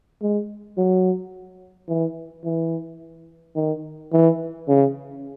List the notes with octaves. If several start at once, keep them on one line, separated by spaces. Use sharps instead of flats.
G#3
F#3
E3
E3
D#3
E3
C#3